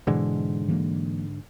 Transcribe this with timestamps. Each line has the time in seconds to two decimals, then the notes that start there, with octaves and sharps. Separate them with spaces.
0.07 G#2 B2 D3 E3 G#3
0.68 E3 F#3 A#3